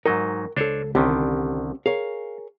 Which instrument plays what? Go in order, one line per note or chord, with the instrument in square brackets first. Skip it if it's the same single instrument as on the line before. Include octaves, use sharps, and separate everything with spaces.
[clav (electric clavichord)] G#2 F#3 D#4 [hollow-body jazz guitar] A#4 G5
[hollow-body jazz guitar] C#2 A4 [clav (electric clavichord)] D4 C5 C#5
[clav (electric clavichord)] C2 D3 D#3 [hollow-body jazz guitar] C4 C#4 G4
[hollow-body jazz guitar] G#4 A#4 C#5 [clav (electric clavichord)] F5